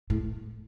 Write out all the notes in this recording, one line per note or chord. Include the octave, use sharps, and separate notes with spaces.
A2